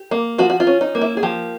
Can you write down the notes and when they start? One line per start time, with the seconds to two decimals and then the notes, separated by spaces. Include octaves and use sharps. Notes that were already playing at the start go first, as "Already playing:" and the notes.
Already playing: G4
0.11 A#3
0.38 F3 F#4
0.50 F#4
0.60 F4
0.67 C#4
0.81 D#4
0.95 A#3
1.01 E4
1.17 G#4
1.23 F3 G4